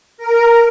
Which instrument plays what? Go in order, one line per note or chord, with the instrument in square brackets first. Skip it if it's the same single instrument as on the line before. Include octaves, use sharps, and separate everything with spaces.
[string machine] A#4